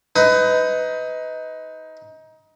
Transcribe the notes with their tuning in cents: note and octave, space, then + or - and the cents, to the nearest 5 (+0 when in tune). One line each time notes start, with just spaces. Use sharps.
D#4 +20 B4 +25